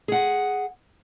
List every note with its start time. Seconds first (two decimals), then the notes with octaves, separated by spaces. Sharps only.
0.08 G#4 F#5